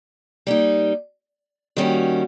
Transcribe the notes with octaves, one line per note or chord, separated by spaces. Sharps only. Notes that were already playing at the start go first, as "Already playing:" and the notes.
G3 A#3 D#4
D#3 G3 A#3 C#4 F#4